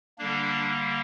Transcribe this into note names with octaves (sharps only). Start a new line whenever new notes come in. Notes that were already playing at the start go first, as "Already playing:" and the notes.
D3 G3 A#3 D4